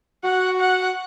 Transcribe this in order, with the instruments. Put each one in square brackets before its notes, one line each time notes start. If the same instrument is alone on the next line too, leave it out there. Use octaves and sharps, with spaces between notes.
[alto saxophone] F#4 [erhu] F#5
[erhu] F#5